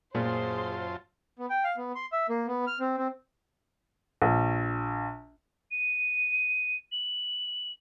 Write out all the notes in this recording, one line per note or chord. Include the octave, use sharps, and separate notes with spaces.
F#2 A#2 F4 G#4 C5 A5 C6
B3
G5
F5
B3
C6
E5
A#3
B3
F6
C4
C4
A#1
D#7
F#7